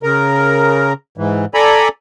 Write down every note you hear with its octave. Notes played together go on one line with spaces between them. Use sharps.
C#3 A#4
G#2 E3
A4 D5 G#5 A#5 B5